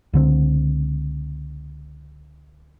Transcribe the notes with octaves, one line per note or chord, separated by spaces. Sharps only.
C#2 D3 C4